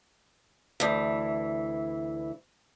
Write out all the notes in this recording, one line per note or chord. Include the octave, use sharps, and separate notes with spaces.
D2 E3